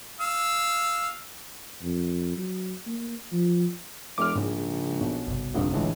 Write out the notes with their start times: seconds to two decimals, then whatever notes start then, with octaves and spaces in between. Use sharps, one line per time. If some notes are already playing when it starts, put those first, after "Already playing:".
0.20 F5 E6
1.82 F2
2.37 F#3
2.87 A#3
3.32 F3
4.18 E1 D6 F6
4.36 A#1 G#2 C#3
5.00 B1 B2
5.27 G1 C2
5.54 F1 A#1 G2
5.73 C#2 A2 D3 E3